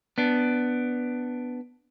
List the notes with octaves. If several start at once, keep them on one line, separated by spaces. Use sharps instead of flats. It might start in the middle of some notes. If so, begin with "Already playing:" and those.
B3 D4